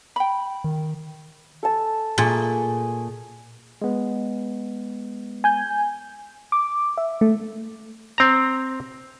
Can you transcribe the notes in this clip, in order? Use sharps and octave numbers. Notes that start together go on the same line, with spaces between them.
G5 B5
D#3
A4 A5
A#2 A3 G#4
G#3 B3
G#5 G6
D6
E5
A3
C4 A#5